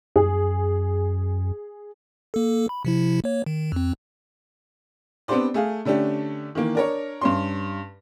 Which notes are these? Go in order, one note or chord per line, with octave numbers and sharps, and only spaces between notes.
F#2 G#4
A#3 A4
B5
C3 F3 E4
A#3 C#5
D#3
F2 C4
B3 C4 D4 G4 C5 D5
A3 G#4 F5
D3 A3 C#4 D4 G4
D#3 E3 A#3
D4 A#4 C#5
G2 C#4 C6